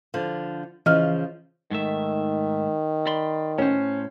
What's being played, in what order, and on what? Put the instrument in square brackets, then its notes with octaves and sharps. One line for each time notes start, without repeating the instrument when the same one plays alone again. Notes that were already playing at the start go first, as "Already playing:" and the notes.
[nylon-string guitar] D3 F3
[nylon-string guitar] C#3 F3 [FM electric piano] E3 [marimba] D#5 F6
[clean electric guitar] G#2 A3 E5 [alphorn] D#3
[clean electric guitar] D5 B5 C6
[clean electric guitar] A2 C5 [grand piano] C#4